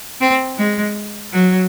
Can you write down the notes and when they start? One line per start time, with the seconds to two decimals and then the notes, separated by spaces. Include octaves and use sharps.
0.21 C4
0.58 G#3
1.32 F#3